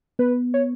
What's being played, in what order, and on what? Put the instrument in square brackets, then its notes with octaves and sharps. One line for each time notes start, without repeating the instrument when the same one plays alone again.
[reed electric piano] B3 [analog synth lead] B4
[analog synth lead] C#5